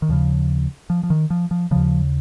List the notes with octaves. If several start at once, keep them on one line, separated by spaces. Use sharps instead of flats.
D#3
D#2 C#3 F3
F3
F3
D#3
F3
F3
D#2 C#3 F3